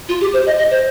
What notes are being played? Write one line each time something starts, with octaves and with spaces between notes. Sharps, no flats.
F4
G4
C5
D#5
D#5
C5